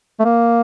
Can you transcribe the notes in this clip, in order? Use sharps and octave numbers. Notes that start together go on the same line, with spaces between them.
A3
A#3